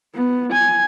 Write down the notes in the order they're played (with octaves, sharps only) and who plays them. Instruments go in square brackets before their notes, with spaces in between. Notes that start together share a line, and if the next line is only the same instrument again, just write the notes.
[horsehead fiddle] B3
G#5